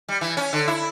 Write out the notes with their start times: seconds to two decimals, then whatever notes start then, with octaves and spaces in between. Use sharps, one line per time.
0.08 G3
0.21 E3
0.37 C#4
0.53 D3
0.68 E4